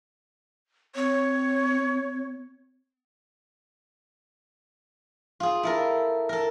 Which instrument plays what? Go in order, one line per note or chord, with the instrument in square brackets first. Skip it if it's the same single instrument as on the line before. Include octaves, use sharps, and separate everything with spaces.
[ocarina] C4 [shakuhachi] C#5
[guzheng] F4 G#4
E4 A4 A#4
A4 A#4